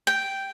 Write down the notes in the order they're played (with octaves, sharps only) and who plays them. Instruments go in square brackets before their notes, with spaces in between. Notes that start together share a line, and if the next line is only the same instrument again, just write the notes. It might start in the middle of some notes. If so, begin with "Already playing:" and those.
[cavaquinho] G5